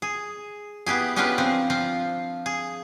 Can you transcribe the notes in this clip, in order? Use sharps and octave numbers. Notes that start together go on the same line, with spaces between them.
G#4
B3 E4 G4 G#4
B3 C#4 D4 F4 G4 B4
F3 C4
F3 C4 F4
G#4